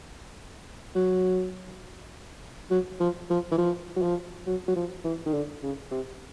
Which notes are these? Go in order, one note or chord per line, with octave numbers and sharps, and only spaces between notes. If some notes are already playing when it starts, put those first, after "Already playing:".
F#3
F#3
F3
F3
E3
F3
F#3
F3
F#3
F#3
F3
E3
D#3
D3
C#3
C3